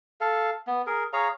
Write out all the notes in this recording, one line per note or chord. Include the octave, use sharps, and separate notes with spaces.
A4 F5
B3
G#4 A#4
G#4 C#5 F5 A#5